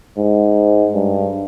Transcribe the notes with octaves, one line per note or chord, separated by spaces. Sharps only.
G#2
G2